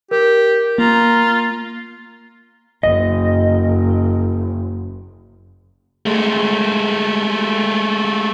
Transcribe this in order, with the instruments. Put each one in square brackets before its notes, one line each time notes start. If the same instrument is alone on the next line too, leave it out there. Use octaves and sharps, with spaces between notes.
[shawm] G4 [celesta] A#4
[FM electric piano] A#3 [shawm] F4 [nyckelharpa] A#5
[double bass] F#1 [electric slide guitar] D#5
[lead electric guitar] G#3 A3